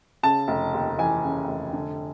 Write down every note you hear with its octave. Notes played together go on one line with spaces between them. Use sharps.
C#3 A5
F1
D#2
E3 G#5
C#3
F1
D3